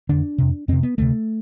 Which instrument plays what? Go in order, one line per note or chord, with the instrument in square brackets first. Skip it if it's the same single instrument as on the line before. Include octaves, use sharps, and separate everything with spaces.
[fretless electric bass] F2 D3 D4
F2 C3
F2 C3 C4
B3
D2 C3 A3